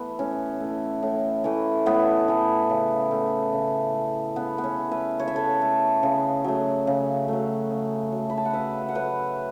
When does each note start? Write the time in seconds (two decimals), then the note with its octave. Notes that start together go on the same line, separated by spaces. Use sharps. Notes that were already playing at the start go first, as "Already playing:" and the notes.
Already playing: E3 A3 B3
0.19 A2 C#4
0.60 E3 A3
1.03 A2
1.44 E3 A3
1.86 A2 B3
2.28 E3 A3
2.70 C#3
3.11 A3
3.52 C#3
3.94 A3
4.36 C#3 B3
4.58 B3
4.64 C#4
4.78 A3
4.91 B4 E5
5.19 C#3 C#5
5.28 E5
5.36 A4 C#5
5.62 A3
6.03 C#3
6.44 F#3 A3
6.87 C#3
7.28 F#3 A3
7.71 C#3
8.12 F#3 A3
8.30 B5
8.37 A5
8.45 F#5
8.53 C#3 B4 E5
8.81 E5
8.89 F#5
8.95 F#3 A3 B4 E5